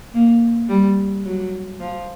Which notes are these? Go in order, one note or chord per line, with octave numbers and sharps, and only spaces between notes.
A#3
G3
F#3
F3